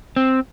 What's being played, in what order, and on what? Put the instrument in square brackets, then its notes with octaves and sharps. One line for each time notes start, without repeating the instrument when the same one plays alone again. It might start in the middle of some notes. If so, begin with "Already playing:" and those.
[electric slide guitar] C4